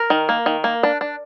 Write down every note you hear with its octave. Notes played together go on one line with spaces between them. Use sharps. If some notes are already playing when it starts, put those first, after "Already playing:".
Already playing: A#4
D#3
A#3
D#3
A#3
D4
D4